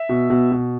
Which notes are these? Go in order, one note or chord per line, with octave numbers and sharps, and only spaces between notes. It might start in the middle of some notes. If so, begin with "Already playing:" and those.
Already playing: E5
B2
B2
B2